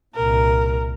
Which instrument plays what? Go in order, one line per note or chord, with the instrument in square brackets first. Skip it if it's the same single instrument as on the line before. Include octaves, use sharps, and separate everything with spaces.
[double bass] C2 A#2 [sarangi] A#4